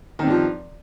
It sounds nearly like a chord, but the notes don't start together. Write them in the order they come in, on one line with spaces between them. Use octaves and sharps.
D#3 C4 G2 F3